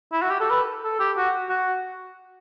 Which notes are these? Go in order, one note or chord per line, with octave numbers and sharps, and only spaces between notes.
E4
F#4
G4
A4
B4
A4
G4
F#4
F#4